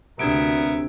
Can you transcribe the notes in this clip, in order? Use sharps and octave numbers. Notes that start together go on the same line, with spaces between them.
D2 C3 B3 D4 A#4 E5 G#6 D7